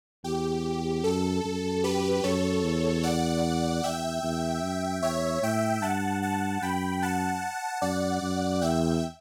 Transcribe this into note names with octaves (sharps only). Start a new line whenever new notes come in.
E2 G4
F#2 A4
F#2
G4 B4
F#2 A4 C#5
E2
D5 F#5
E2 E5 G5
E2
F#2
E2 C#5 E5
A2 E5 G5
G2 F#5 A5
F#5 A5
F#2 G5 B5
F#5 A5
F#2 D5 F#5
F#2
E2 E5 G5